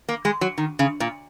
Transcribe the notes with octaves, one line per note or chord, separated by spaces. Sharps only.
A#3
G#3
F#3
D#3
C#3
A#2